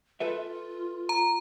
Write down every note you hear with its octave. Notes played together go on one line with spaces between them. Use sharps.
F4 A4 B4 E5
A#5